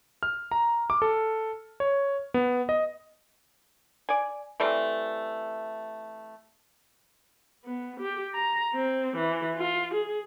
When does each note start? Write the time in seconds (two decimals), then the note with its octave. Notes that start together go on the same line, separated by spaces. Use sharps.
0.23 F6
0.51 A#5
0.90 D6
1.02 A4
1.80 C#5
2.34 B3
2.69 D#5
4.09 D5 G#5
4.60 E3 G3 A3 C4
7.65 B3
8.00 G4
8.34 A#5
8.74 C4
9.17 E3
9.57 F4
9.94 G#4